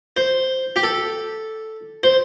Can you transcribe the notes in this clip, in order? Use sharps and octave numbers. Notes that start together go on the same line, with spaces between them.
C5
G4
A4
C5